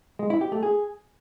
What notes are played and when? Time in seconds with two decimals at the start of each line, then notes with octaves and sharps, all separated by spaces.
0.19 G#3
0.30 E4
0.41 G4
0.52 A3
0.63 G#4